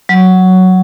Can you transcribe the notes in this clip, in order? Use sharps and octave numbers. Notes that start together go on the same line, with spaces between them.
F#3